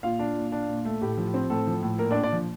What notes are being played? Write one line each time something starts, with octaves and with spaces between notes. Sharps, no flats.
A#2 F4 F5
D4
A#2
D4
A#2
A3
A2 G4
F3
C4
A2 A4
F3
A2
A#2 A#3 A#4
D4 D5
A#2
D4 D5
F3